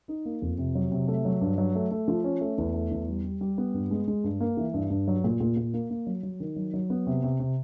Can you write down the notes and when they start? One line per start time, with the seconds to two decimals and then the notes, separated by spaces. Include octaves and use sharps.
0.08 D#4
0.25 A#3
0.42 F2
0.58 C3
0.75 F#3
0.91 C3
1.08 A3
1.25 F#3
1.41 G2
1.58 F#3
1.75 A3
1.91 A3
2.08 F3
2.24 C#4
2.41 A3
2.58 E2
2.74 A3
2.91 E2
3.08 G3
3.24 G3
3.41 G3
3.58 B3
3.74 G2
3.91 G#3
4.08 G#3
4.24 G2
4.40 A#3
4.57 E3
4.74 G2
4.90 G2
5.08 F#3
5.24 A#2
5.40 A#2
5.57 A#2
5.74 A#3
5.90 A#3
6.07 F#3
6.23 F#3
6.40 D#3
6.56 F#3
6.74 F#3
6.90 B3
7.07 C3
7.23 C3
7.40 C3